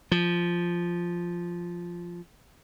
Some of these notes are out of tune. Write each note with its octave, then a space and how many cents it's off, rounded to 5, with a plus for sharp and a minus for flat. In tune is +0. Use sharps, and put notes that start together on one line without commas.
F3 -5